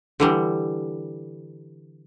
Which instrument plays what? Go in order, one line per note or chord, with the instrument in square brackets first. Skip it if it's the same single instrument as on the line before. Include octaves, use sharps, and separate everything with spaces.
[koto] D3 E3 G3